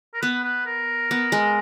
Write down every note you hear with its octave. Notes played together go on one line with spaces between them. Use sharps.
A#4
B3 B4
B4
A#4
B3
G#3